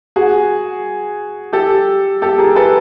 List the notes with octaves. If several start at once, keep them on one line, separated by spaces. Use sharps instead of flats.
F#4 G#4
G4 A4
G4 A4
G#4 A#4
A4 B4